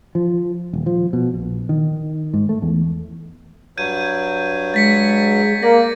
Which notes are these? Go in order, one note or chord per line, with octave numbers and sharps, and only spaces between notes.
F3
D#1
F3
B2
A#1
D#3
G#2
A3
E2
G2 F#3 G6 G#6 D#7
G#3 A6 B6 C#7
A#3 D5 A#6 C#7